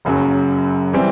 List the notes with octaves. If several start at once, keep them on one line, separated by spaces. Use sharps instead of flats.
F#1 F#2 C#3 F#3
E3 G3 C4